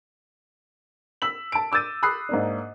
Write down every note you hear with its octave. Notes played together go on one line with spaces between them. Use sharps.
E6 B6 F#7
A5 D7
D6 E6 G6 A6 D#7
B5 D#6 F#6 C7
G#2 A#3 D4